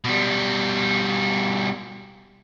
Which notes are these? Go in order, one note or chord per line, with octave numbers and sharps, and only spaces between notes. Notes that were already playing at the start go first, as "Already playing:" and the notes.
B2 G3